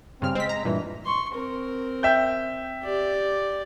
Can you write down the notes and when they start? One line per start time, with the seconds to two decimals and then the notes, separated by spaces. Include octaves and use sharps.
0.22 G2 C#3 C4 F6
0.35 G#3 C4 B6
0.49 A#5
0.65 G2 A#2 E3
1.05 C6 C#6
1.35 C4 A#4
2.03 E5 G5 G6
2.84 G4 D5